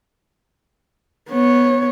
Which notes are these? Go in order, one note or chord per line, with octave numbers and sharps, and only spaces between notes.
B3 C#5